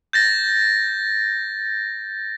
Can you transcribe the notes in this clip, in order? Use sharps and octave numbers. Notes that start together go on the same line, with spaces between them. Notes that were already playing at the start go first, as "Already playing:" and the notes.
G6 A6 A#6